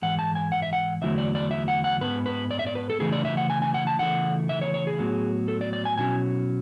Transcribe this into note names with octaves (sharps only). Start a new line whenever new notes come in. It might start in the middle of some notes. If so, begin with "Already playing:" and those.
G#2 E3 F#5
A5
G#5
F#5
E5
F#5
E2 D3 F#3 A3 E4 E5
D5
D5
E5
F#5
F#5
G#2 G#3 B3 B4
B4
D5
E5
D5
B4
A4
C#3 E3 A3 E4 G#4
D5
E5
F#5
G#5
G#5
F#5
A5
C#3 E3 A3 E4 F#5
E5
C#5
C#5
G#4
A2 F#3 B3
A4
D5
D5
G#5
B2 F#3 C#4 E4 G#5